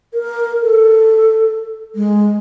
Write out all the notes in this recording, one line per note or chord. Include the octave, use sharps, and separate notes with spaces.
A#4
A4
G#3